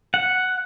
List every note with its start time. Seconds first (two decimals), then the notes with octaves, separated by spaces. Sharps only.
0.14 F#5